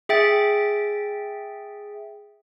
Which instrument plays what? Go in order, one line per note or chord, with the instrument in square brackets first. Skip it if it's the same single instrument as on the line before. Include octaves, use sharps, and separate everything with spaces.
[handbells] G#4 E5 G5 A6